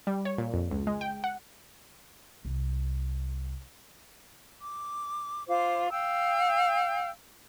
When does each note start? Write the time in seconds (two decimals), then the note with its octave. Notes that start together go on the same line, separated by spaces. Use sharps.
0.07 G3
0.25 C#5
0.38 A#2
0.54 F2
0.71 C#2
0.87 G#3
1.01 G5
1.24 F#5
2.45 C2
4.61 D6
5.48 F4 C5 D6
5.91 F5 G5 E6